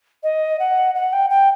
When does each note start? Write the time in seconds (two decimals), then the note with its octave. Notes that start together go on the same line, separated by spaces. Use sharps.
0.23 D#5
0.59 F#5
0.95 F#5
1.13 G5
1.30 G5